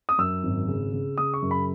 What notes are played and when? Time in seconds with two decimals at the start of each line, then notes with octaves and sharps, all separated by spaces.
0.09 D#6
0.18 F#2 E6
0.43 G#1
0.68 C#3
0.93 C#3
1.18 C#3 D#6
1.34 C#6
1.42 F#2
1.51 B5